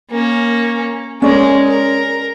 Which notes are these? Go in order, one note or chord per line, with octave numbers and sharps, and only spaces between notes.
A#3 C#4
G#3 C#4 A#4 D5
A#4